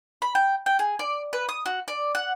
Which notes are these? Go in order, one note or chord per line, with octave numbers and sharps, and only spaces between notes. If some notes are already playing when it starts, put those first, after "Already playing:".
B5
G5
G5
G#4
D5
B4
D#6
F#4
D5
F#5